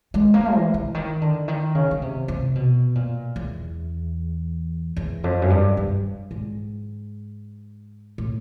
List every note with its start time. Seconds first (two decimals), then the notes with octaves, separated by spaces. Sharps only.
0.14 G#3
0.34 A#3
0.54 E3
0.74 D3
0.94 D#3
1.21 D3
1.48 D#3
1.75 C#3
1.91 C#3
2.02 C3
2.28 C3
2.55 B2
2.95 A#2
3.36 E2
4.97 E2
5.24 F2
5.42 F#2
5.50 G2
5.77 G2
6.31 G#2
8.18 A2